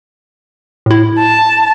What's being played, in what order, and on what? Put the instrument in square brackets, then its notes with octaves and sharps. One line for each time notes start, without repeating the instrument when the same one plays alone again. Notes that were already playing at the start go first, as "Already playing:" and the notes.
[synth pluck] A2 E4
[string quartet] A5